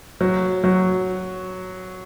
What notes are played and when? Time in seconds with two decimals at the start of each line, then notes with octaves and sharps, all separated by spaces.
0.21 F#3
0.64 F#3